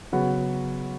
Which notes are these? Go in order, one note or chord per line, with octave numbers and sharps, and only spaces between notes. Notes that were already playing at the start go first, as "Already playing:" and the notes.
C#3 F#3 B3